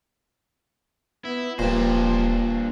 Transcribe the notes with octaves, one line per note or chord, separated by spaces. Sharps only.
B3 E4
D#1 G2 A#2 F3 D4 C5